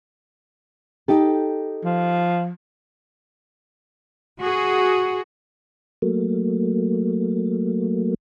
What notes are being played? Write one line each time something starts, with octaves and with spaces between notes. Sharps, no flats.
D#4 G4 A4
F3
F#4 G#4
F#3 A3 A#3